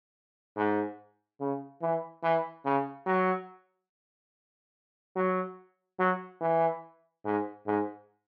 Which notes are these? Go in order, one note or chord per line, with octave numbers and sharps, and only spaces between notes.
G#2
C#3
E3
E3
C#3
F#3
F#3
F#3
E3
G#2
G#2